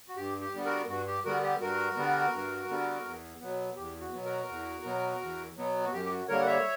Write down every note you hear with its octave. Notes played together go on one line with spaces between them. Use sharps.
F#4
G2 G4
G4
D3 G3 B3
F#4 A#4
G2 F#4
G4
D3 G3 B3 F#4 A#4
G4
G2 F#4 A#4
D3 G3 B3
G2
D3 G3 B3
E2
B2 F#3 B3
E2 G4
F#4
B2 F#3 B3
F#4 A#4
E2
B2 F#3 B3
E2
B2 F#3 B3
F#4
F#2 G4
G4
F#4
D3 G3 A#3 A#4 C#5
F#5
C#5 E5